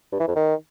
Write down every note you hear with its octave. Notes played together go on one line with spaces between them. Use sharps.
G2
E3
F2
D#3